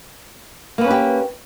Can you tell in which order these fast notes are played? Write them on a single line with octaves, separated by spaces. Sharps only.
A#3 B3 C#4 B4 G4